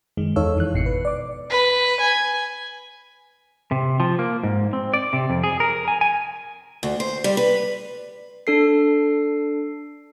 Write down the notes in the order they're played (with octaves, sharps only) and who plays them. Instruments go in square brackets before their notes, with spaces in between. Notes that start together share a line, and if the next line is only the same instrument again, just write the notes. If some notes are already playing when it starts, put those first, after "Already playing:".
[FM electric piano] F#2 D#3 G#3
E2 D#4 A4 C#5 F5 E6
F2 E3 F#6
G#1 B2 C7 C#7
B4
D5 D6
[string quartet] B4
G#5
[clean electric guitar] C3
F3
A#3
G#2
C4
D5
C3
F2
G#4
A#4
G#5
G#5
[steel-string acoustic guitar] D2
C5
G3
B4
[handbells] D4 A4 C7